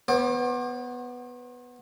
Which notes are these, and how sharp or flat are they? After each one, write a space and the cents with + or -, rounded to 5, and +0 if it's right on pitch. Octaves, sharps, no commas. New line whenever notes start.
B3 +0 C5 +45 D6 +25